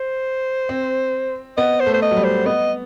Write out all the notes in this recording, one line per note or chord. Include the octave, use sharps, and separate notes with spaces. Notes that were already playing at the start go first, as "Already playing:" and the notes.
Already playing: C5
C4
B3 D#5
C5
A3
C5
D#5
F#3
G3
C5
B3 D#5